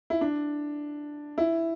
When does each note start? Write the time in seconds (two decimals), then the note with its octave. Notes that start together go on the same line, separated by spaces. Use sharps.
0.10 E4
0.21 D4
1.38 E4